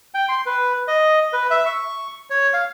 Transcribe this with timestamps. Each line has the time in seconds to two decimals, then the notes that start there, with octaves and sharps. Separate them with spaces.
0.14 G5
0.29 C6
0.46 B4
0.88 D#5
1.33 B4
1.51 E5
1.66 C#6
2.30 C#5
2.54 F5